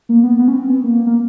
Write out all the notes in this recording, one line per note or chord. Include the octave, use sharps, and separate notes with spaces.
A#3
B3
B3
C#4
C4
B3
A#3
A#3